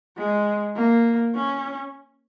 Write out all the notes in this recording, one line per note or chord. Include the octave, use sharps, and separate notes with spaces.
G#3
A#3
C#4